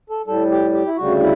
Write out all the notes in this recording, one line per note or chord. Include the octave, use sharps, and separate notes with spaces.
A4
A2 G3 A4
G4
G4
E4
D2 C#3 G3 F#4
E4